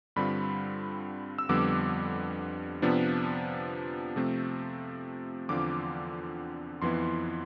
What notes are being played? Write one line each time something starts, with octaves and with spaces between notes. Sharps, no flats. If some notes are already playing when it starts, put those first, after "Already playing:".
G2 D3 G3 C4 F4 B5
E6
F2 D3 G3 B3 D6
C3 F3 B3 D4
C3 F3 A3 C4
E2 D3 F3 C4 F4 D6
F2 E3 B3 E4 C6